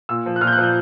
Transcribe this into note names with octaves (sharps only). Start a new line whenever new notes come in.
A#2 E6
F3
F#6
A#2 F6
G6
F#6
F3
G6